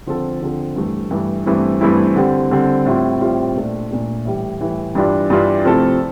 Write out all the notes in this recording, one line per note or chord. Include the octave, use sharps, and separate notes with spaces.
D3 F3 C4 F4 A4
D3 F3 C4 F4 A4
G2 E3 A3
G2 E3 A3
G2 E3 A3 C4 E4
G2 E3 A3 C4 E4
D3 G3 C4
D3 G3 C4
A2 G3 C4 F4
A2 G3 C4 F4
A#2 A3 D4
A#2 A3 D4
A2 E3 G3
A2 E3 G3
G2 E3 G3 D4 F4
G2 E3 G3 D4 F4
C3 F3 A3 E4 A4